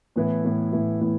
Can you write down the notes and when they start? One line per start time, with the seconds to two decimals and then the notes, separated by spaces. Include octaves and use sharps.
0.16 A2 E3 B3 E4
0.44 A2 E3 B3 E4
0.72 A2 E3 B3 E4
1.01 A2 E3 B3 E4